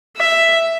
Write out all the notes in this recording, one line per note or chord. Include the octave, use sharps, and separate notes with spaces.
E5